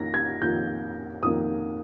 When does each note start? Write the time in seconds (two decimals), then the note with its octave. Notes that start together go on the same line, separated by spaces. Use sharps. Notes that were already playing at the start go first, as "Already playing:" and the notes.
Already playing: F2 D#3 A#3 A#6
0.14 G#6
0.42 F2 D#3 A#3 G6
1.23 F2 D#3 A#3 D#6